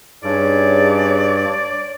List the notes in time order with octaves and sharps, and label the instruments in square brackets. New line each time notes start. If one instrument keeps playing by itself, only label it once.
[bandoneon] G2 [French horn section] C#4 D#4 G#4 [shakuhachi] C#5 [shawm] D5